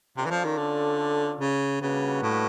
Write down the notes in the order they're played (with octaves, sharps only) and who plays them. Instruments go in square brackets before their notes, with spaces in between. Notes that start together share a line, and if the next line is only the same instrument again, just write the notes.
[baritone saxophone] C3 [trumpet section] C#4 F4 A4 D5
[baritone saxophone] E3
F3
D#3
D3
C#3
[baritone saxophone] C#3 [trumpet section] G3 A#3 D4 F#4 B4
[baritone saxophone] A2